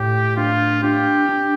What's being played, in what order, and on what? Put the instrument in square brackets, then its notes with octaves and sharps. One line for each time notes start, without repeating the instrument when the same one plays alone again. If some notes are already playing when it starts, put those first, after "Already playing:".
Already playing: [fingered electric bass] A2 [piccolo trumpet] G4
[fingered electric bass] D4 [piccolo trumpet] F4
[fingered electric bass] D4 [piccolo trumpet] G4
[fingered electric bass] D4